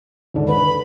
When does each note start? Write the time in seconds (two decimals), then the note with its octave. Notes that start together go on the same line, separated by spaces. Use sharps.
0.34 D#2 G#2 D3
0.49 B4 B5